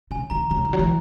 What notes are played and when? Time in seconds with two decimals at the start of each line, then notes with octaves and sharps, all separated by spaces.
0.11 C#3 G#5
0.30 D#3 A#5
0.50 C#3 A#5
0.65 D#3
0.73 F#3
0.79 E3